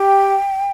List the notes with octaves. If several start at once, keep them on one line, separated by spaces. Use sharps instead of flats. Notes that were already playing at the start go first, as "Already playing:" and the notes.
Already playing: G4 G5